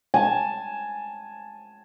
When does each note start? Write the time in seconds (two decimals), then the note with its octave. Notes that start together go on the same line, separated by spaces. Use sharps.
0.14 G#5 A5